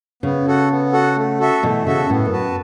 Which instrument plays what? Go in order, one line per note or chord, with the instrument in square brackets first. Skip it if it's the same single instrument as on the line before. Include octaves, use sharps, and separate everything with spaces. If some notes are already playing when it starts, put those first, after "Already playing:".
[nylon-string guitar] C#3 [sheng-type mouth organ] B3
[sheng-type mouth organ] F#4 A4 F#5
B3
F#4 A4 F#5
A3
F#4 A4 E5
[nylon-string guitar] B2 E3 [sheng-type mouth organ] A3
[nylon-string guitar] C#3 [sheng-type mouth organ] F#4 A4 E5
[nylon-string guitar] A2 [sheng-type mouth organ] B3
[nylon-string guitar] F#2
[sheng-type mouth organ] F#4 B4 A5